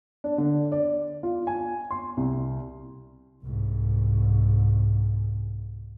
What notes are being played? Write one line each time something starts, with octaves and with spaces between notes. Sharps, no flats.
D4
D3
D5
F4
G#5
C6
C2
C2 G#2